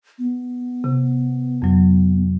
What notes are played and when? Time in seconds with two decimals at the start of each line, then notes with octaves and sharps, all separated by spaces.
0.19 B3
0.84 C3
1.62 F2 F#3